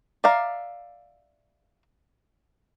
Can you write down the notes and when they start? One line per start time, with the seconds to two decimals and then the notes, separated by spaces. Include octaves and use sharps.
0.24 D5 E5 F5 A#5